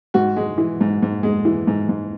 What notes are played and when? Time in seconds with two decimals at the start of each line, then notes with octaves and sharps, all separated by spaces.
0.14 G#2 F#4
0.36 G#3
0.58 E3
0.81 G#2
1.03 G#2
1.23 G#3
1.45 E3
1.67 G#2
1.89 G#2